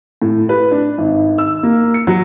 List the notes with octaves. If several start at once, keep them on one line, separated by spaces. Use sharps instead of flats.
A2
B4
D4
G#1
E6
A#3
C#7
F#3